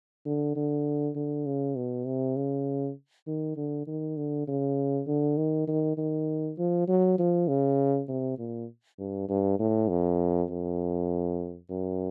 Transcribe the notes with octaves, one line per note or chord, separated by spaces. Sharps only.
D3
D3
D3
C#3
B2
C3
C#3
D#3
D3
D#3
D3
C#3
D3
D#3
D#3
D#3
F3
F#3
F3
C#3
C3
A#2
G2
G2
A2
F2
F2
F#2